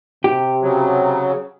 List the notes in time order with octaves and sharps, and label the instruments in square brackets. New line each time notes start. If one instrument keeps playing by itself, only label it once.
[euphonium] C3 [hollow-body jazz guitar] G4
[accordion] C#3 F#3